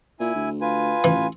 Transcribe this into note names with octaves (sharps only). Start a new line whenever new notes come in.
A#2 E4 G#5
D2
F4 B4 G#5
A1 E3